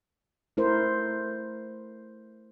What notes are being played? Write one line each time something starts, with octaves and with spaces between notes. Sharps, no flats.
A3 E4 A#4 C5